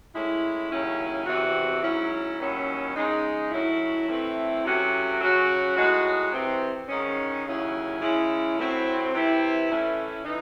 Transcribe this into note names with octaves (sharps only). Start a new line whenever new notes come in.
A2 G#3 C#4 E4
D#2 C#3 F#3 C#4 E4
E2 C3 E3 C4 F#4
G#2 F#3 C#4 E4
D#2 D#3 F#3 C#4 E4
C#3 G#3 D#4
A2 F#3 C#4 E4
A2 E3 A3 C4 E4
C3 F#3 A3 C#4 F#4
C#3 F#3 C#4 F#4
A2 G#3 D#4 F#4
C3 E3 C4
G#2 D#3 G#3 C#4
D#2 C#3 F#3 C#4 E4
C#3 G#3 C#4 E4
A2 F#3 C4 E4
C3 E3 C4 E4
A2 E3 A3 C#4 E4
E3 D#4